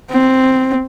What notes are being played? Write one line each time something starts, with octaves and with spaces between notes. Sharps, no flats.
C4